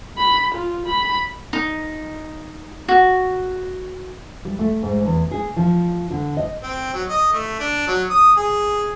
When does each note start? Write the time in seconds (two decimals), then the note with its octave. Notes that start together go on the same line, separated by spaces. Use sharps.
0.18 B5
0.54 F4
0.86 B5
1.53 D#4
2.88 F#4
4.45 G3
4.59 A3
4.83 G#2
5.05 E2
5.31 G#4
5.56 F3
6.11 D3
6.37 D#5
6.63 C4
6.94 F#3
7.09 D#5
7.33 A3
7.60 D4
7.88 F#3
8.10 D#6
8.37 G#4